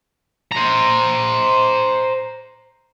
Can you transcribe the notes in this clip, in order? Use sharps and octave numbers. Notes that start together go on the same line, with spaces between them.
C5 A#5